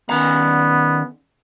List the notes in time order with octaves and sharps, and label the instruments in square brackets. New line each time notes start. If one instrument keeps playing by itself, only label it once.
[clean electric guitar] D#3 C#4 A#5 [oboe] B3